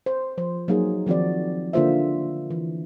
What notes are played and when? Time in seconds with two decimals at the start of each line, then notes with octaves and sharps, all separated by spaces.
0.06 C5
0.38 F3 C5
0.68 F#3 A#3 D#4 G#4
1.06 D#3 F3 C4 F#4 D5
1.73 D3 A#3 F4 C5 E5
2.50 E3